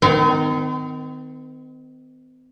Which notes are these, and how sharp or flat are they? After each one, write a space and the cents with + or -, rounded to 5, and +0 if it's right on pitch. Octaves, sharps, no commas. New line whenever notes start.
D#3 -5 C4 -45